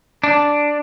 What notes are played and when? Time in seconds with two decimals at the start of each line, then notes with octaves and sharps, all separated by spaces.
0.24 D4